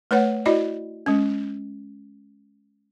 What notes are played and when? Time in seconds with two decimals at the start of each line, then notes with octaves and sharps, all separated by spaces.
0.11 A3 B4 C#5 F#5
0.46 E4 F#4 D5 D#5
1.06 G#3 C#4